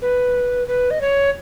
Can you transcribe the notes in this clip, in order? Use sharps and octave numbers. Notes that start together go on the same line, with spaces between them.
B4
B4
D#5
C#5